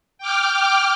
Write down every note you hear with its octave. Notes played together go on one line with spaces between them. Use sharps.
G5 D6 F6